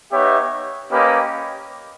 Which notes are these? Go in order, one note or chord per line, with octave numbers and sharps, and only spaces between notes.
B3 D#4 G4 C#5 E5
A#3 C#4 G4 B4 D#5